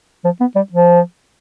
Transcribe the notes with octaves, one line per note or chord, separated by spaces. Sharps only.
F3
B3
G3
F3